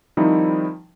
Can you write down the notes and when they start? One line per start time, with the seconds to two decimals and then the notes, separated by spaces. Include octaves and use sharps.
0.17 D#3 F3 G3 C4 D#4 E4